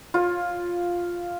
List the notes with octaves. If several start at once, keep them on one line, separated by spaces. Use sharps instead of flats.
F4 C#5